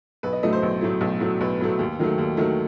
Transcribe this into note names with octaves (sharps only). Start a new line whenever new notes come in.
B1 B4
D#5
A2 F#3 A3 D#5
C5
B1
A2 F#3 A3
B1
A2 F#3 A3
B1 B4
A2 F#3 A3
D#2
D#3 F#3 A3
D#2
D#3 F#3 A3